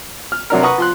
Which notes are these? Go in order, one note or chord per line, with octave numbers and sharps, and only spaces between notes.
F6
C3 F#3 D4 A#4
B4 F#5 A#5 C#6 D#6
F3 C6 F#6